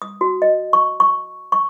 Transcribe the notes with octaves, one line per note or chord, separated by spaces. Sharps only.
D#6
F#4
D#5
C#6
C#6
C#6